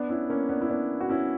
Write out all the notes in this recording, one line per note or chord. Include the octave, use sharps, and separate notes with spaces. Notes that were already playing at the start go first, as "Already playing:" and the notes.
Already playing: B3 D4
C#4 E4
A#3 C#4
B3 D4
E4
B3 D4
F#4
C#4 E4